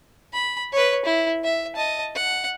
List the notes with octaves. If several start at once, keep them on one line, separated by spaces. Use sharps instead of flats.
B5
B4 C#5
E4
E5
D#5 A5
F#5